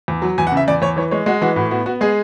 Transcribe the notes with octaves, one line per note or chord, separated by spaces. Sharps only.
E2
F#3
E2 G#5
F#5
C#3
E5
E2 D5
E2 C#5
E3 C#5
G#3 C#5
G#3 F#4
E3 F#4
A2 F#4
B3 F#4
B3 F#4
G#3 G#4